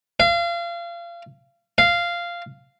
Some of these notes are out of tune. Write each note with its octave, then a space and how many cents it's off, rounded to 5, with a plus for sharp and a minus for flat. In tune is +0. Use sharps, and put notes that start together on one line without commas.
F5 -30
F5 -10